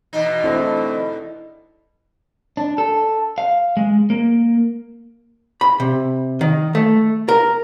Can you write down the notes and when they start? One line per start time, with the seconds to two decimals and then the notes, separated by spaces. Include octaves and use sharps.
0.13 E2 B2 D#4
0.44 D3 A3 C4 E4 A4
2.57 D4
2.78 A4
3.38 F5
3.77 G#3
4.10 A#3
5.61 B5
5.80 C3
6.41 D#3
6.75 A3
7.29 A#4